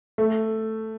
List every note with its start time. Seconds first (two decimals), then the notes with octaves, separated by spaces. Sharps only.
0.18 A3